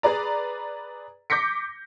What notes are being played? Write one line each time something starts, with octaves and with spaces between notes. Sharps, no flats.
G#4 B4 D5 A#5
D6 G6 A#6 B6 C#7